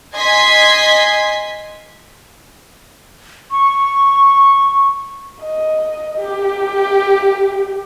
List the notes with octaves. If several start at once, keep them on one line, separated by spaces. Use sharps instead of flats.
D#5 G#5 C6 G#6 B6 C7
C#6
D#5
G4